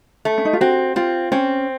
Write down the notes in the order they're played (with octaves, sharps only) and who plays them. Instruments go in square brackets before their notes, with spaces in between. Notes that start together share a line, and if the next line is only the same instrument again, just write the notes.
[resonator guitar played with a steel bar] A3
[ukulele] C#4
D#4
F4
[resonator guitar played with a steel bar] C4 [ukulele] F#4
[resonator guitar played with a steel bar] C4 [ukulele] F4
[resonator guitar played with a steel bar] C4 [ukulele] C#4